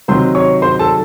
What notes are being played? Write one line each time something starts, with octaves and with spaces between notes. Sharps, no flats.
C3 D#3 F#3 C5 C6
C#5 C#6
C5 C6
A4 A5